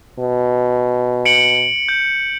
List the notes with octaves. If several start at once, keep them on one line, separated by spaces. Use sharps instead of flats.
B2
C#7 D7 F#7
G6